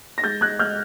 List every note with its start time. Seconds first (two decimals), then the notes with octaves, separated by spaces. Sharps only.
0.18 A#6
0.23 G#3 G6 A6
0.41 G#3 F#6 G#6
0.59 G#3 F6 G6